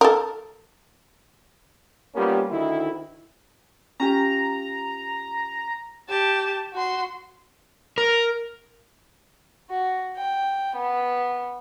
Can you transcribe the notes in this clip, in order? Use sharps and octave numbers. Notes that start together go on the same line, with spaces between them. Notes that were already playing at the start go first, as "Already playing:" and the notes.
A4 A#4
G3 A#3 B3 C#4 F4 G4
D2 D#3 E4
C#4 F4 G4 A#5
G4 A5
F#4 C6
A#4
F#4
G5
B3